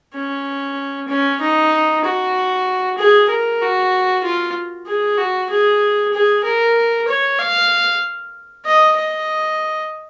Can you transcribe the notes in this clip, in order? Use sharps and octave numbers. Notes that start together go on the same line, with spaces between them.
C#4
C#4
D#4
F#4
G#4
A#4
F#4
F4
G#4
F#4
G#4
G#4
A#4
C#5
F5
D#5
D#5